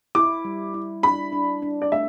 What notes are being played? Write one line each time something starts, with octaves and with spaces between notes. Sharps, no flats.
E4 D6
G3
E4
D4 B5
D4
D4
D5
A3 E5